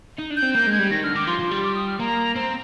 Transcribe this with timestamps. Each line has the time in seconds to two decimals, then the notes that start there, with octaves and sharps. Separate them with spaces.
0.18 D#4
0.30 D4
0.37 G6
0.42 C4
0.55 A#3 G6
0.67 G#3
0.72 G#6
0.79 G3
0.91 D#3 A#6
1.03 D3 F6
1.15 D#3 D6
1.27 F3 C6
1.39 F3
1.51 G3
1.63 D6
1.75 D#6
1.88 F6
2.00 A#3 A#5
2.36 C4 A#5